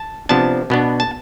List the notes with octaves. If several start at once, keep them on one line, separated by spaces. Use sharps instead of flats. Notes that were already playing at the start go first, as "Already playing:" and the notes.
Already playing: A5
C3 F3 B3 D4 A5
B2 B3 D4
A5